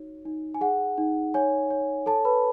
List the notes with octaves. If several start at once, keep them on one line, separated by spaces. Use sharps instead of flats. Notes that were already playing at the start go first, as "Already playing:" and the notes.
Already playing: D#4 F#4 C#5
D#4
G#5
G#4 F#5
D#4
C#5 G#5
C#5
A4 C#5 A5
B4 B5